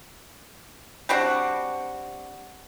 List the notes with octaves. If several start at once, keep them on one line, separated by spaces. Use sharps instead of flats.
G3 C4 D4 F#4